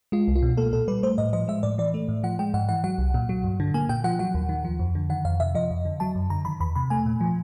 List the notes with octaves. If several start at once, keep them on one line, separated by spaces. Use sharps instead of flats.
G#3 F4
C2
F4
B2
A#3 A4
A#2 A4
G3 B4
A3 C5
A2 D#5
F3 D#5
G#3 E5
A2 D5
E3 D5
A3
A2
F3 F#5
G#3 G5
G#2 F#5
E3 F#5
F#3 F#5
C2
A#2
F#3
G2
D3
A#3 G#5
A#2 G5
F3 F#5
F#3 F#5
D#2
D#3
F3
F2
D3
D#3 F#5
F2 F5
C3 E5
F3 D#5
F2
D3
F#3 A5
F#2
D3 A#5
D#3 B5
E2 B5
C3 B5
A3 G#5
A#2
F3